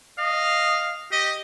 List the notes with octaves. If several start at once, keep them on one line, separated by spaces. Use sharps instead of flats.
D#5 F5
G4 D#5